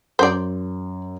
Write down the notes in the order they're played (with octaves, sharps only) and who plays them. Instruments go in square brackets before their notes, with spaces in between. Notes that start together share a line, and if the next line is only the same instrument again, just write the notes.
[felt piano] F#2 [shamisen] C5 D5